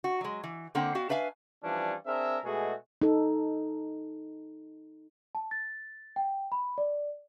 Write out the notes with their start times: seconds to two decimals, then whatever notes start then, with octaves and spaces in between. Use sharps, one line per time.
0.04 F#4
0.21 F#3 G#3
0.44 E3
0.75 D3 A#3 C4 F#5 G5
0.95 B3 F#4 F5
1.09 D4 B4 E5 F5 G#5
1.63 E3 F3 G3 C#4 D4
2.06 C4 D4 G#4 A#4 E5
2.43 B2 G#3 A3 F#4 G#4
3.02 D#4 A4
5.35 A5
5.51 A6
6.16 G5
6.52 B5
6.78 D5